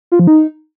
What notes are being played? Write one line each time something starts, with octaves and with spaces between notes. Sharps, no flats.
F4
F3
D#4